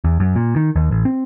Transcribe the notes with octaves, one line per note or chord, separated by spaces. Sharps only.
E2
F#2
A#2
D#3
D#2
A1
C4